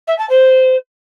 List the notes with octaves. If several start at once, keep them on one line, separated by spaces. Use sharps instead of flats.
E5
A5
C5